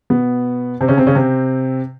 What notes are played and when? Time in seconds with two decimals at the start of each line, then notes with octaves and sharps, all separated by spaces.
0.10 B2 B3
0.81 C3 C4
0.88 C#3 C#4
0.97 C3 C4
1.07 C#3 C#4
1.15 C3 C4